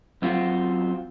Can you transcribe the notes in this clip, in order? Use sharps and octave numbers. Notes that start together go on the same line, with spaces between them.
F#2 C4 F4 F#4